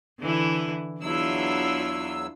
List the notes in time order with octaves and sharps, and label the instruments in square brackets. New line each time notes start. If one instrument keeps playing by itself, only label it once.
[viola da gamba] D3 E3 E4
[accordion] E2 F#3 E6 [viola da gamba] D4 E4 F4